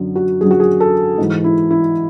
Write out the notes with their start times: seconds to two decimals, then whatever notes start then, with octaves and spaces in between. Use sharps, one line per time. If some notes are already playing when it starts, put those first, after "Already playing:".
Already playing: F#2 D3 F#3
0.16 F#4
0.41 F#2 D3 F#3 G#4
0.51 F#4
0.60 G#4
0.80 A4
1.18 G#2 E3
1.44 E4
1.71 E4